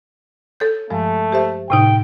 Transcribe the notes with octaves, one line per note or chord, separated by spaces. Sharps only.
A4 C#5 G6
G2 F3 G#3 A3
G4 C5 E5
A2 C3 D#4 G5